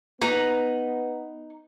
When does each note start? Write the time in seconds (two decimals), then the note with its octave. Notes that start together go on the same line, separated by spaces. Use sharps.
0.21 B3 D#4 B4 A#5